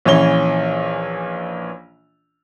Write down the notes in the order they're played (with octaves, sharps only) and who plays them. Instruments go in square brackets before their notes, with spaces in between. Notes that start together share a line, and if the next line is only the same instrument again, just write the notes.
[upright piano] A#1 E3 C#4 G7